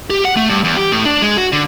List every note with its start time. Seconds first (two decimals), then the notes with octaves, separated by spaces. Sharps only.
0.10 G4
0.25 F#5
0.37 A3
0.49 G2
0.64 E2
0.77 G4
0.92 A2
1.05 D4
1.22 G#3
1.37 F#4
1.52 D3